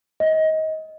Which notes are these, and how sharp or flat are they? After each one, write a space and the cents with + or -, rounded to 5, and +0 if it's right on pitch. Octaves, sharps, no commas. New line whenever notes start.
D#5 +20